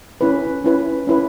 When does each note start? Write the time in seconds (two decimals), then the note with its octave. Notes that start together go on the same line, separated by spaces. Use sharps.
0.21 C#4 E4 B4
0.64 C#4 E4 B4
1.07 C#4 E4 B4